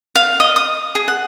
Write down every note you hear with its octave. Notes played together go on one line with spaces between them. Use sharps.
F5
D#5
D#6
G#4
F#5